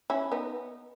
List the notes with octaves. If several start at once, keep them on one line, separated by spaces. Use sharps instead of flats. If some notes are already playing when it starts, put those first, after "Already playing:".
C#4 E4
B3 D#4